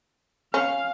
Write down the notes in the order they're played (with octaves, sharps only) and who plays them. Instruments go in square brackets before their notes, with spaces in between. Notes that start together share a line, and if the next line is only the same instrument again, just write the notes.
[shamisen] C#4 [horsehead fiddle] F5